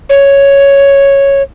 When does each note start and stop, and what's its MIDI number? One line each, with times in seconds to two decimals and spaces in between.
0.10 1.42 73